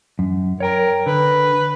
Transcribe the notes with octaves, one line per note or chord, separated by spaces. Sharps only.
F#2
A#4 C#5 G5 A#5
D3 B4